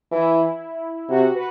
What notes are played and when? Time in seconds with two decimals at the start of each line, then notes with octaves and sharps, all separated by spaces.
0.12 E3 E4
1.09 C3 F#4
1.34 B4